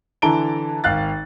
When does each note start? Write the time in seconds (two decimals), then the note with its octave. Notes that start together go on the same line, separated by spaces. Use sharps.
0.22 D3 E3 A5 A#5 D7 G7
0.84 G#1 F5 F#6 A6